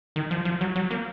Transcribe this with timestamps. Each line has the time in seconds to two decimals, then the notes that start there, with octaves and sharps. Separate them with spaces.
0.16 D#3
0.31 F3
0.45 F3
0.61 F#3
0.76 F#3
0.91 A#3